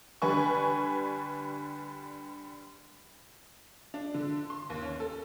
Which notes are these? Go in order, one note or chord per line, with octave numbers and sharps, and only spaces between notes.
D3 G3 B4 G#5 C#6
D4
D3
C6
D#2
C#4
A4